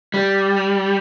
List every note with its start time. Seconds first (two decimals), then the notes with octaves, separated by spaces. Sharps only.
0.14 G3